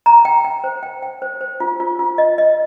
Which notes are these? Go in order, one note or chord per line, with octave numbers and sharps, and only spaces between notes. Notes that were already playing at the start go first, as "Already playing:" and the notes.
A#5
G5
G5
C5
G5
G5
C5
C5
F4
F4
F4
D#5
D#5